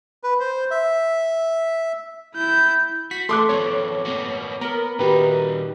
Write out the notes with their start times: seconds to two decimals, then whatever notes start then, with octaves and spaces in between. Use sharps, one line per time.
0.23 B4
0.40 C5
0.71 E5
2.35 E4 G6
3.11 F#4 B6
3.29 A3 A4 C6 D6 F#6
3.49 F3 B3 C4 C#5
4.05 A#3 B3 F#4
4.61 B3 A#4
4.99 A#2 D#3 D#4 F#4 G4 B4